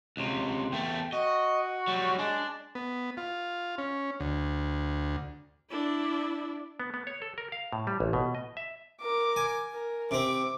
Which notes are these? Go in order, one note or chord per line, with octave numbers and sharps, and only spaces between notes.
C#2 C3
E2 A3 G5
F#4 D#5
F#3 G3
G#3 D4
B3
F4
C#4
D2
D4 E4
B3
B3
C#5
A4
A#4
F5
A2
G3
A1
B2
D#5
E5
A#4 D6
G#5
A#4
C3 C4 D6